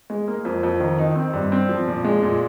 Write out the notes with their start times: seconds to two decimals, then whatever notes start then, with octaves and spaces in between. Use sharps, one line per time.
0.10 G#3
0.28 A#3
0.45 F2
0.63 F2
0.80 D#3
0.99 D#4
1.16 C4
1.33 G2
1.52 C4
1.69 F3
1.88 A#2
2.04 G#3
2.23 A#2